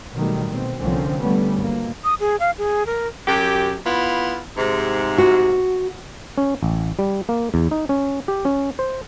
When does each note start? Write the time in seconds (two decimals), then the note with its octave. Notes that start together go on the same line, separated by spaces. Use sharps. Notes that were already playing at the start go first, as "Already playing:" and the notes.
0.15 B2 D#3 F#3 G3 A3
0.49 B2 C4
0.80 C2 D3 F3 A#3 C4 C#4
1.20 D3 G3 A3 B3 C#4
1.56 G#1 A#3
2.03 D#6
2.20 G#4
2.40 F5
2.58 G#4
2.86 A#4
3.27 F#2 G4
3.85 B3 E4 F4
4.57 G#2 C3
5.18 F#4
6.38 C#4
6.63 A1
6.99 G3
7.29 A#3
7.54 E2
7.71 D#4
7.89 C#4
8.28 G4
8.45 C#4
8.79 C5